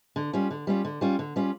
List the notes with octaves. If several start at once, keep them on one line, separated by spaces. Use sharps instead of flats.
D3
G3 C#4 F4
D3
G3 C#4 F4
D3
G3 C#4 F4
D3
G3 C#4 F4